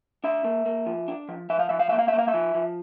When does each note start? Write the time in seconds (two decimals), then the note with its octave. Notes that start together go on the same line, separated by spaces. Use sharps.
0.24 D4 E5
0.44 A#3
0.66 A#3
0.86 F3
1.08 D4
1.29 F3
1.50 F3 E5
1.59 F5
1.69 F3 E5
1.79 F5
1.89 A#3 E5
1.99 F5
2.08 E5
2.13 A#3
2.19 F5
2.28 E5
2.34 F3
2.55 F3